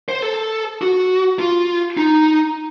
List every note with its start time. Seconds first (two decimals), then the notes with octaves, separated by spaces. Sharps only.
0.09 C5
0.22 A4
0.82 F#4
1.39 F4
1.97 D#4